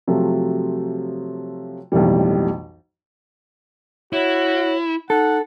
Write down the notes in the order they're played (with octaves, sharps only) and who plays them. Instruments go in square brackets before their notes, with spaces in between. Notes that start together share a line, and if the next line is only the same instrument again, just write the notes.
[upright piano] C3 F3 F#3 A3
B1 F2 A2 E3 G3
[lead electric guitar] E4 [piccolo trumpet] F#4 [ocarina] C#5
[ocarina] D#4 [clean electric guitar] A4 [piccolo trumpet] F#5